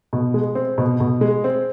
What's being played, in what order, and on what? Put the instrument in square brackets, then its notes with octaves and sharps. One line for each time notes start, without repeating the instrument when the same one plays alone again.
[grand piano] B2
G#3
C4
B2
B2
G#3
C4